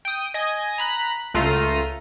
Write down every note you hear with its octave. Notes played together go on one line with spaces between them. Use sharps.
G5 D#6
D#5 G#5
A#5 B5 F#6
C#2 A3 F4 A#5 D#7